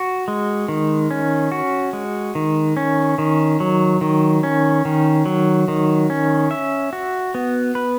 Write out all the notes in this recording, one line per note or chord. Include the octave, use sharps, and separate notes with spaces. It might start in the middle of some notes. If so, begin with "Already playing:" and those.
Already playing: F#4
G#3
D#3
C#4
F#4
G#3
D#3
C#4
D#3
F#3
D#3
C#4
D#3
F#3
D#3
C#4
E5
F#4
B3
B4